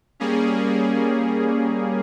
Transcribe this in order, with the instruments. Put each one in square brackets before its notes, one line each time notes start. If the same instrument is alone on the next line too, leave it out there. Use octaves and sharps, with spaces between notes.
[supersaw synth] G3 A#3 C#4 G#4